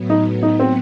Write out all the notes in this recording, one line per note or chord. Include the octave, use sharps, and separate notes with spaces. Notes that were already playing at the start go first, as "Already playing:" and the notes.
Already playing: A2 F#3 B3
D#4
D#4
C4